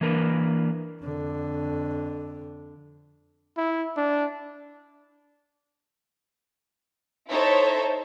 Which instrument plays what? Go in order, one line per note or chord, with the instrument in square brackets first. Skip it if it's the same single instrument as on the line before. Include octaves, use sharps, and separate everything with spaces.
[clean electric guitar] E3 A#3 D4 A#4 B4
[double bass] F2 D3
[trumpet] E4
D4
[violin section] D#4 E4 A4 C5 C#5 E5